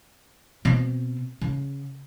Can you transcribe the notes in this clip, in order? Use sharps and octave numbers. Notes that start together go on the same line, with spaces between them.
B2 C4
C#3